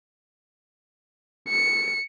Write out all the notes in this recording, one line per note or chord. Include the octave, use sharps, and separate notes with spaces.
C#7